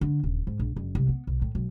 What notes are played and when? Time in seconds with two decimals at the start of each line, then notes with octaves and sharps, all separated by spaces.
0.01 D3
0.23 D#1
0.47 G#2
0.59 A#1
0.76 F#1
0.95 C2
1.09 B3
1.27 B1
1.42 A2
1.55 B1